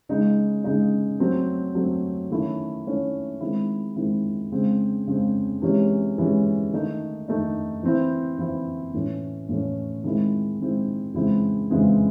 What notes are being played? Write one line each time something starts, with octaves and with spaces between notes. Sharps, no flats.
C#3 G#3 D#4
C#3 G#3 D#4
F#3 A3 C4
F#3 A3 C4
D#3 A3 C#4 E4
D#3 A3 C#4 E4
D#3 G#3 C4 E4
D#3 G#3 C4 E4
C#3 G#3 C4
C#3 G#3 C4
C3 E3 G#3 C#4
C3 E3 G#3 C#4
D#3 A3 D#4
D#3 A3 D#4
E3 C4 E4
E3 C4 E4
A2 E3 A3 C#4
A2 E3 A3 C#4
D#3 G#3 C4 E4
D#3 G#3 C4 E4
C#3 E3 G#3 C4 E4
C#3 E3 G#3 C4 E4